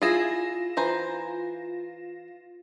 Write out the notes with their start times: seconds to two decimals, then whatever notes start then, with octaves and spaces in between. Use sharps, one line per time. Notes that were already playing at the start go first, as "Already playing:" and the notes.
0.02 E4 F4 G#4 A#6 E7
0.77 E3 C5 A#5